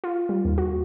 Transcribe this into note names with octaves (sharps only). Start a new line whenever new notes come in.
F4
G3
D#2
F#4